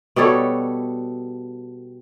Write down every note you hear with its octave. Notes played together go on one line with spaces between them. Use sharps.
B2 G3 A4 C#5